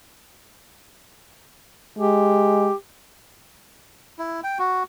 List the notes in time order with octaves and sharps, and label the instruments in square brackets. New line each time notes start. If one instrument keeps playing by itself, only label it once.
[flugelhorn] G#3 [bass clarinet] G4
[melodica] E4
G5
F#4